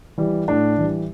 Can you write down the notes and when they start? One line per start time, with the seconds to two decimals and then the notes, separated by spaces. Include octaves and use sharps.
0.18 E3 G3
0.48 A2 D4
0.78 E3 G3